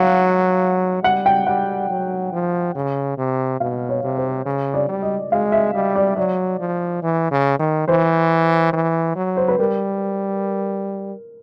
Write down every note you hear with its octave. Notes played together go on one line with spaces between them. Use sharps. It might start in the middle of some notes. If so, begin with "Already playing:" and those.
Already playing: F#3 F5 F#5
G3 F#5
G5
G3 F#5
F#3
F3
C#3
C3
B2 F5
C#5
C3
C5
C#3
D5
G3
D#5
G#3 F5
E5
G3 D#5
D5
F#3 D5
F3
E3
C#3
D#3
E3 C5
E3
F#3
C5
B4
G3 A#4